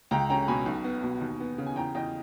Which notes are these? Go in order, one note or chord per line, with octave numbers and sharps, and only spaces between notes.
C#2 G5 A#5
C#4 G5 A#5
B2 G#5 B5
B1
B3
B2
D#2
B3
C#3
G#5
E2 G5 A#5
E2 D#5 G5